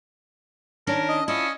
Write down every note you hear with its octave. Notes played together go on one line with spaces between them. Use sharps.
D#3 C#4 D4 A#4
D#5
C#4 E4 F4 D#5